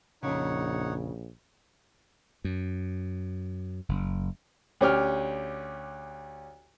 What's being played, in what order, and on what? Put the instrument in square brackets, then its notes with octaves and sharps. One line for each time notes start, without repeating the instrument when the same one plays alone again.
[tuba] A#1 [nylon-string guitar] F2 C#3 [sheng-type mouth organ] D#4 C#5 F#5
[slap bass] F#2
F#1
[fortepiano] D2 C#4 G4 F6